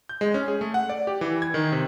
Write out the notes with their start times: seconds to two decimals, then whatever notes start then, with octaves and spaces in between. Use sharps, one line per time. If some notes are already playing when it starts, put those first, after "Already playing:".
0.09 G6
0.21 G#3
0.34 C#4
0.48 G#4
0.61 A3
0.74 F#5
0.89 D5
1.07 G4
1.21 E3
1.42 G#6
1.54 D#3
1.72 C3